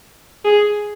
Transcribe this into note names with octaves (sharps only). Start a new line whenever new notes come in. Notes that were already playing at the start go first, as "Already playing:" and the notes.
G#4